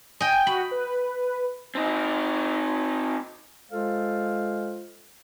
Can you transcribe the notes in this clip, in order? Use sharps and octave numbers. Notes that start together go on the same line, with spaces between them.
D#5 G5 G#5
F#4 B5
B4
C4 D#4
G#3 F4 A4 C5 F5